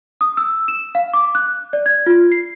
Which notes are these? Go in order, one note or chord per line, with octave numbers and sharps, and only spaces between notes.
D#6
E6
E7
F5
D6
F#6
D5
G#6
F4
C7